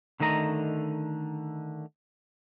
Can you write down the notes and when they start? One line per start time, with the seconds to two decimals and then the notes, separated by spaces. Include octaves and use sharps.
0.20 D3 D#3 A3 D#5 A#5